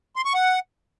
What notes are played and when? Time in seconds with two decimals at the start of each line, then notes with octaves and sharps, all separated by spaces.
0.16 C6
0.25 C#6
0.34 F#5